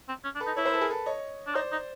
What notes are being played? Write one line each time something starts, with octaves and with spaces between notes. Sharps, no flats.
C4
C#4
D4
A4 B4
D#4
E4 B4 C#5
A#4 C5
A4 B4
G#4 A#4
A4 B4
C#5 D#5
D4
D#4 C5 D5
D#4